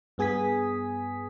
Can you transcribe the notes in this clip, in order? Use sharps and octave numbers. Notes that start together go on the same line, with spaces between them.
G2 B3 G#4 G#5 D#6 B6